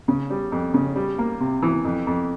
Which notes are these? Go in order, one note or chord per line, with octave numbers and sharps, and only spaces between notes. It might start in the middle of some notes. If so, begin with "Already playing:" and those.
C#3
G3
F2
C#3
G3
A#3
C3
E3
F2
F2